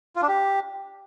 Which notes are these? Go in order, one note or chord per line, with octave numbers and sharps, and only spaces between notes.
F4
D4
G4